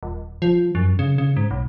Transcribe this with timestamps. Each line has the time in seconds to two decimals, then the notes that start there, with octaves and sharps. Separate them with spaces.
0.03 D#1
0.42 F3
0.75 F#2
0.99 C#3
1.18 C#3
1.37 G#2
1.51 B1